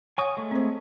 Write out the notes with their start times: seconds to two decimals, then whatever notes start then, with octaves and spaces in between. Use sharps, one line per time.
0.18 C#5 F#5 G#5 C#6 D#6
0.37 G#3 A3 G#4
0.51 C4 C5